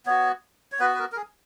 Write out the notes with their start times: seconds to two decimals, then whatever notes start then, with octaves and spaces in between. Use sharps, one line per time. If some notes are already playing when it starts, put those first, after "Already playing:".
0.06 B3 F#4 C#5
0.72 C#5
0.79 B3 F#4 B4
0.94 B4
0.99 A#4
1.12 A#4
1.17 G#4